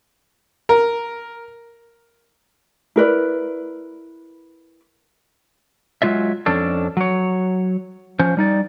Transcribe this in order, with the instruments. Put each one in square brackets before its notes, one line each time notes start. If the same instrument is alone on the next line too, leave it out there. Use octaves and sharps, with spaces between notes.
[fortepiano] A#4
[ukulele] E4 A#4 B4 D5
[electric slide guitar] F#3 G#3 F4 D5 E5
F2 C#4 D4 A4
F#3 C#5
F3 C#4 C5
G3 D#4 D5